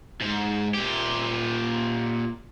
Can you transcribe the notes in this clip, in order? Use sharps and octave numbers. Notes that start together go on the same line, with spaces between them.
G#2
A#2 G4